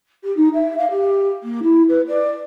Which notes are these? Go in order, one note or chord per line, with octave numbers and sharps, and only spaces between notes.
G4
D#4
E5
F5
G4
A#3
E4
B4
D5